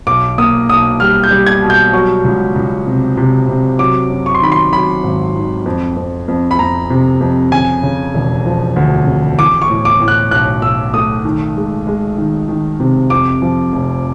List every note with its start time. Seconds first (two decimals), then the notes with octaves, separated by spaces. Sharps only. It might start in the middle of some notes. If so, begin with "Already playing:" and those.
0.07 B1 D6
0.38 A#3 D#6
0.69 B1 D#6
1.00 G3 F6
1.24 G6
1.31 G3
1.46 G#6
1.62 B2
1.70 G6
1.93 F#3 C#6
2.24 C#2
2.56 C#2
2.87 C3
3.17 C3
3.48 C3
3.79 F#3 D6
4.10 F#2
4.26 C#6
4.35 C6
4.42 D#3 B5
4.52 C6
4.72 F#3 B5
5.03 G#1
5.35 D#3
5.66 F2
5.96 F2
6.28 F2
6.51 B5
6.59 F2 A#5
6.90 C3
7.21 F2
7.52 C#3 G#5
7.83 C#3
8.14 E1
8.46 F3
8.76 D2
9.07 C#3
9.38 E3 D6
9.62 C#6
9.70 A2
9.85 D6
10.00 A2
10.08 F#6
10.31 B1 F#6
10.62 B1 E6
10.93 A3 D#6
11.25 D#3
11.56 G#3
11.87 G#3
12.18 D#3
12.49 D#3
12.80 C3
13.10 F2 D6
13.42 F3
13.73 F1